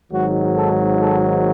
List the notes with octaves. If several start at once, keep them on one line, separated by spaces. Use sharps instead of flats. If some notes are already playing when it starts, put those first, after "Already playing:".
G#1 G#2 D#3 F#3 F#4
A4
A4